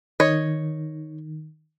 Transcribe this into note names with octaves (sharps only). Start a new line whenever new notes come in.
D#3 C#5 D#5